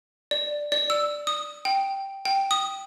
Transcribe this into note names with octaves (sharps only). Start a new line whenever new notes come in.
D5
D5
E6
D#6
G5
G5
D#6